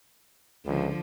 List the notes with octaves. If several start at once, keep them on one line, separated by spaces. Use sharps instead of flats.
C#2 D3 F3